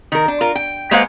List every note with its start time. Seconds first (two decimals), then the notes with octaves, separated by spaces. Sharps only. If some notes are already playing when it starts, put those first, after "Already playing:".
0.12 D#3 A#4
0.28 D4
0.41 F4 A#4
0.55 G5
0.91 G#3 A#3 B4 C5 F5 F#5